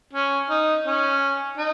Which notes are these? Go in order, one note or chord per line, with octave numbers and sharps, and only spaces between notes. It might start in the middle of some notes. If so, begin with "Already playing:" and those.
C#4
D#4
C#4
D#4